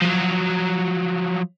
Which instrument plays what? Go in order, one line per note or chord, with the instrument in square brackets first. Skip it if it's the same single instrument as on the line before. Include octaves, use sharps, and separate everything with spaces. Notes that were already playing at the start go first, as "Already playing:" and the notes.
[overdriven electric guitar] F3 F#3